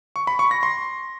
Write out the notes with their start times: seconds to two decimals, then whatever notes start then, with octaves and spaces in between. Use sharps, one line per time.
0.16 C#6
0.27 B5
0.39 C#6
0.51 A#6
0.63 C6